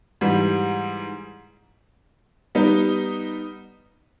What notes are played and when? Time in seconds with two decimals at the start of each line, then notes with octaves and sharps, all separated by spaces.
0.21 G#2 E3 G3
2.55 G3 B3 D#4